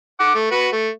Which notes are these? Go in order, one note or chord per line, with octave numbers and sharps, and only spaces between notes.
F#5 D6
A3
F#4 B4
A3